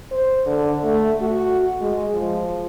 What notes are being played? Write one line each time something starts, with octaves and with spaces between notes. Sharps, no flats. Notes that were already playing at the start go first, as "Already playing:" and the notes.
C5
D3
A3
F#4
G#3
F3